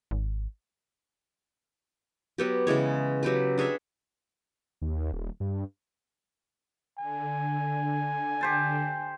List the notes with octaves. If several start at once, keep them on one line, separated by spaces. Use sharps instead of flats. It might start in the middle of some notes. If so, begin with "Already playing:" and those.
G#1
F#3 B3 G4
C#3 E3 G#3 C#5
F#3 G4 B4
D4 G#4 C#5 E5
D#2
D#1
G2
D3 G#5
G4 C5 A5